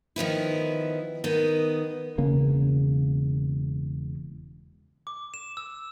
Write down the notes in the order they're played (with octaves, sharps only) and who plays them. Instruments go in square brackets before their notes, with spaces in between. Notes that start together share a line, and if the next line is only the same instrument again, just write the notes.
[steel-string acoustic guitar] D#3 F3 B3 E4
D#3 B3
[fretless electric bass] E1 C#3 A#3
[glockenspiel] D6
E7
E6